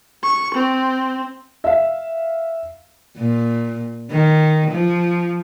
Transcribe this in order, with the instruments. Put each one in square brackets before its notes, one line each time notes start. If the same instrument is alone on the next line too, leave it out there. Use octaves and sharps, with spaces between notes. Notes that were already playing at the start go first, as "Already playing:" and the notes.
[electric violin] C#6
C4
[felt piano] E5 F5
[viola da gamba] A#2
D#3
F3